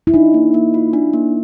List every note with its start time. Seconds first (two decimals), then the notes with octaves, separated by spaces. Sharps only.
0.07 E4
0.14 D4 D#4
0.34 A#3
0.54 A#3
0.74 F4
0.93 D4
1.13 A#3